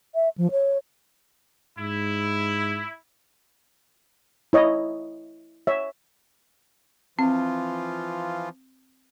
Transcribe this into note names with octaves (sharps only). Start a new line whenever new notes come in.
E5
F3
C#5
G#2 E4
E4 C#5 D#5
C#5 E5
E3 F3 C4 F4